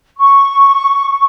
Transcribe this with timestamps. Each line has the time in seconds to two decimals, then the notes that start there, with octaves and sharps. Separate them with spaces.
0.17 C#6